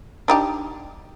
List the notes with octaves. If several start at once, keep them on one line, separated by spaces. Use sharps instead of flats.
D4 D#4 G4